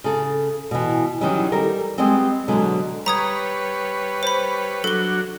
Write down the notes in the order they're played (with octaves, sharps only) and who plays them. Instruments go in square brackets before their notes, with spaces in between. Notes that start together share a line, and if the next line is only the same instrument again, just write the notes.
[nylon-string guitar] C#3 A4
B2 E3
D#3 E3 F#3 G3 C#4 E4
G3 A4 A#4
G3 G#3 B3 C4
B2 D3 F#3 G#3
[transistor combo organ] G3 B4 C#5 [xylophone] A#5 D#6 G#6
[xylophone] C5 B5
[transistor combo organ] F#3 D4 F#4 [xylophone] A4 G7